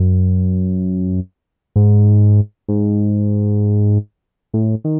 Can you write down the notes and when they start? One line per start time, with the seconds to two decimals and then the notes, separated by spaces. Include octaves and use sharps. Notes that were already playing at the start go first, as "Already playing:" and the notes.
Already playing: F#2
1.76 G#2
2.68 G#2
4.54 A2
4.84 D#3